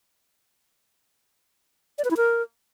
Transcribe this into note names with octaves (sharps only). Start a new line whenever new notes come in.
D5
B4
E4
A#4